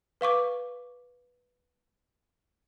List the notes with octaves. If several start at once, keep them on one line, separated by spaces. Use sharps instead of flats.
B4 F5 C#6 D6